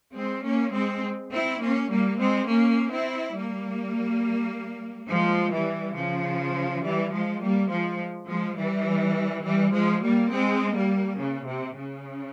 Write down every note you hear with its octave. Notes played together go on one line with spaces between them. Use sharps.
G#3 C4
A#3 C#4
G#3 C4
C4 E4
A#3 C#4
G3 A#3
G#3 C4
A#3 C#4
C4 E4
G3 A#3
F3 G#3
E3 G3
C#3 F3
E3 G3
F3 G#3
G3 A#3
F3 G#3
F3 G#3
E3 G3
E3 G3
F3 G#3
G3 A#3
G#3 C4
G3 A#3
C#3
C3
C#3